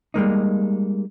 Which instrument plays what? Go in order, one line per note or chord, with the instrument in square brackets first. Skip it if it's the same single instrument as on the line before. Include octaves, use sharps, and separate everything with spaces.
[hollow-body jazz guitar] G3 G#3 A#3 D#4